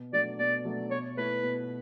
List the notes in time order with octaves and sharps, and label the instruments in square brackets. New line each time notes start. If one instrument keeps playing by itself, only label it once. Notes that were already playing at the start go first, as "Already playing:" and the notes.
Already playing: [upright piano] B2
[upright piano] F#3 A3 D4 [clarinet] D5
[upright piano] B2 [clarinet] D5
[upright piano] F#3 A3 D4
[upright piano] B2 [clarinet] C#5
[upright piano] A3 E4 [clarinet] B4
[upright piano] B2